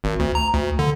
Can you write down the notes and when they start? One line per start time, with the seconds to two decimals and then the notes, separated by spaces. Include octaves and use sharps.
0.04 G#1
0.20 D2
0.35 A#5
0.54 D2
0.79 D3